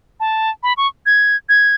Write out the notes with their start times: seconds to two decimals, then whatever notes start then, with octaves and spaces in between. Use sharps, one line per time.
0.20 A5
0.63 B5
0.77 C#6
1.06 G#6
1.49 G#6